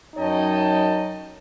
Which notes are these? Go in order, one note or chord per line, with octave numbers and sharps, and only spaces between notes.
F#2 D#4 C#5 D#5 G5 A5